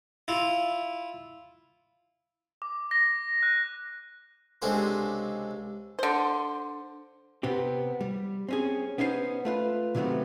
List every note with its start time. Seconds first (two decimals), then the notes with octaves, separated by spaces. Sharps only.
0.28 E4 F4
2.62 D6
2.91 A#6
3.43 F#6
4.62 C#2 C3 G#3 D4 A4 C5
5.99 D3 C5
7.43 C3 B3 C4 G4
8.01 G3
8.49 C4 C#4 G#4
8.98 B3 C#4 D#4 E4 C5
9.45 A3 F4 B4
9.95 C3 D#3 F#3 A3 B3 C4